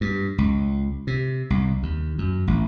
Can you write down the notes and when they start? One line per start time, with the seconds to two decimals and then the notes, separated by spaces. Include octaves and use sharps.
0.01 G2
0.38 C#2
1.07 C3
1.50 C2
1.83 D#2
2.18 F#2
2.47 A1